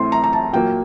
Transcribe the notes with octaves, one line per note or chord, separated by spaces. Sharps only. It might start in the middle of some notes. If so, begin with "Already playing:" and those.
Already playing: A2 A3 C4 C6
A#5
A#5
A5
A#2 F#3 A#3 G5